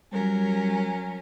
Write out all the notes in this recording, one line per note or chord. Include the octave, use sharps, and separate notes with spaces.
F#3 G3 C#4 A#4